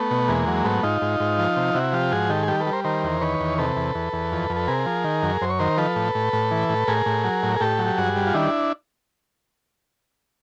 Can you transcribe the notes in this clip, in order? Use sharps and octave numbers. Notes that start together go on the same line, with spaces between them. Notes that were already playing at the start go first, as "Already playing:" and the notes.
Already playing: A3 B3
B2
E2 G#3 A#3
F#3
G#2 A3 B3
G#2 D#4 F4
G#2
G#2
F3
C3
C3 E4 F#4
F3 F4 G4
G#2 F#4 G#4
D#3 G4 A4
G#4
G3 G4 A4
A4 B4
G3
A#4 C5
D#3 A#4 C5
E2
D#3 B4 C#5
E2
C3 A4 B4
E2
E2
E2
F2
F2
A4
C3 G#4 A#4
F3
D#3
F#2
F#2 C5
C#5
D#3 A#4 C5
F3 A4 B4
A2
A2
A2
E3
A2
A2 G#4 A#4
A2
F#3
A2
G#4
A2 G4 A4
F#3
G4
G2 F#4 G#4
G3
F4
D#3 D4 E4